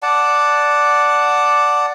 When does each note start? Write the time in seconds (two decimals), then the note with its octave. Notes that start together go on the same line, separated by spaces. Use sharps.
0.03 D5 F#5 A5